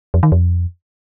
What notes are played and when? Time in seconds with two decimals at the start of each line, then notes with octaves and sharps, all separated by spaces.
0.14 F2
0.23 D#3
0.32 F2